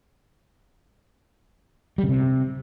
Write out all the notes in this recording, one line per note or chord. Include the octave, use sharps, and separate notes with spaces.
G3
C#3
C3